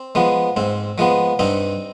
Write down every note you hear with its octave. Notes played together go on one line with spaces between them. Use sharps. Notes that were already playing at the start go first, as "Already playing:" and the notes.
Already playing: C4
F3 G#3 B3
G#2 C4
F3 G#3 B3
G2 C4 D#4